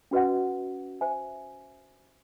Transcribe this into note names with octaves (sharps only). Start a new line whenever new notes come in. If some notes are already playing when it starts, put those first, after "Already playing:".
C#4 F#4 B4 D#5 F#5
C5 E5 G#5